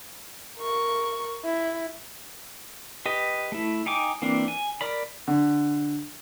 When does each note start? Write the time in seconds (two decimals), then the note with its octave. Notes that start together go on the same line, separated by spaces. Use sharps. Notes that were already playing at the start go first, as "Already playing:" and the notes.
0.58 A#4 C#6
1.45 E4
3.06 G4 B4 D#5
3.52 A3 E4
3.86 D#4 G5 G#5 D6
4.22 E3 A#3 C4 D4
4.48 G#5
4.81 A#4 D5 B5
5.28 D3